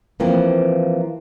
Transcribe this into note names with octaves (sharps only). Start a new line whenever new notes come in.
E3 F3 A#3 C4